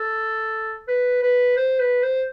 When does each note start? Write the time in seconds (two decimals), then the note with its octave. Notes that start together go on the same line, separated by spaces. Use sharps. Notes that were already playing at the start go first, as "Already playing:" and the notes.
Already playing: A4
0.88 B4
1.22 B4
1.56 C5
1.79 B4
2.03 C5